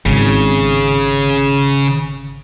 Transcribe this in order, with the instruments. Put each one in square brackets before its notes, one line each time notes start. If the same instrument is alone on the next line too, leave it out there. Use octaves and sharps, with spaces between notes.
[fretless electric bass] G#1 [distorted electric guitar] C#3